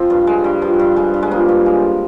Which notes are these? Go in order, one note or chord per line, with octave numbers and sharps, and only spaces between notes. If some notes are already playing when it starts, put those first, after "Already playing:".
Already playing: F3 C4
G2
G#3
G2
F3
G2
G#3
G2
G#3
F3 A#3
G2
G#3